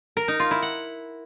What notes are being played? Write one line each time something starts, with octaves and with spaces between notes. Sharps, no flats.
A#4
D#4
F4
E4
F#5